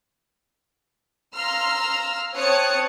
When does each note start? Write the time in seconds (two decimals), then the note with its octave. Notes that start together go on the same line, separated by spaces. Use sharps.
1.34 F5 A#5 C6 E6 F6
2.37 C4 C#5 A5 D#6 F#6 C#7